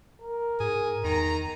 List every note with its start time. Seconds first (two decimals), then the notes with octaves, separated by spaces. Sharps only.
0.22 A#4
0.60 G#2 G#4
1.04 E2 D#3 A#5